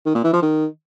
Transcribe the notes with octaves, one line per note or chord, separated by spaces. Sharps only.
D#3
A#2
E3
F3
D#3